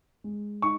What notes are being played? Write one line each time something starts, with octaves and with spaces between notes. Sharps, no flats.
G#3
D#4 C#6